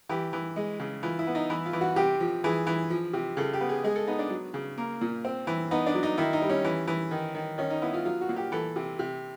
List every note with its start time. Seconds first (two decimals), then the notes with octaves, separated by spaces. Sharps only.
0.09 E3 G4
0.33 E3
0.56 G#3
0.80 C#3
1.03 E3 F4
1.19 E4
1.27 B3
1.35 D#4
1.50 E3 E4
1.66 F4
1.73 E3
1.81 F#4
1.96 C3 G4
2.20 F3
2.44 E3 G#4
2.67 E3
2.90 F3
3.13 C3
3.37 C#3 A4
3.53 G4
3.61 B3
3.69 G#4
3.84 G#3 G#4
3.96 A4
4.07 B3 D#4
4.19 D4
4.30 F#3
4.54 C#3
4.78 A#3
5.01 A#2
5.25 C4
5.47 E3
5.71 B3 D#4
5.86 D4
5.95 F#3
6.03 D#4
6.18 D#3 E4
6.33 D#4
6.42 G3
6.50 C#4
6.65 E3
6.88 E3
7.11 D#3
7.35 D#3
7.58 D#3 C#4
7.70 D#4
7.82 B3 E4
7.93 F4
8.05 F#3 F4
8.21 F#4
8.29 A#2
8.36 G4
8.52 E3 A4
8.76 C3
8.99 C3